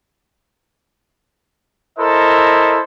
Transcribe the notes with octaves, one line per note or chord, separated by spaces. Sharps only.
E4 A4 A#4 C5 D#5